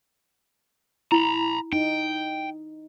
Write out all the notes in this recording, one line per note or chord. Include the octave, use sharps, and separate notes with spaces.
E4 A#5 B5
D#4 G5